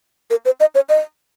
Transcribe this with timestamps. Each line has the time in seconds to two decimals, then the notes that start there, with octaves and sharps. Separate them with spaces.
0.30 A#4
0.45 C5
0.60 D#5
0.75 C#5
0.89 D#5